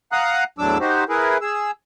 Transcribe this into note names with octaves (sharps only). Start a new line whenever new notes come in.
F5 F#5 A#5 D#6 F#6
E2 A2 F#3 D4 D6 E6
D#4 F#4 G4 C5
E4 G#4 A#4 B4
G#4 E6